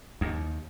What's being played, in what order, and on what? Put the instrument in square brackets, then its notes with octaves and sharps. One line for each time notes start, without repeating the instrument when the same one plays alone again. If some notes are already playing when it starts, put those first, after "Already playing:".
[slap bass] D#2